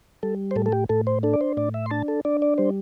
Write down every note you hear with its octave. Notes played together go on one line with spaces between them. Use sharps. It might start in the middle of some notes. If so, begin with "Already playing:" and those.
G3 A4
C5
A2 A4
A4
G4
A2 A4
C5
D4 A4
D5
C5
A2 D5
E5
C6
D4 A5
A4
D4 D5
D5
G3 C5